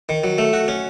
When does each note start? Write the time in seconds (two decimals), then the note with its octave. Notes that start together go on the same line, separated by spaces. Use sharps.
0.09 D#3
0.24 F#3
0.38 A3
0.53 F#4
0.68 C#4